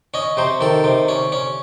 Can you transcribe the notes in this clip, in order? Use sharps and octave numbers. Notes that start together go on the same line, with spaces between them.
C#4 D#5
C3 C5
D#3 A4
C3
C#4
C#4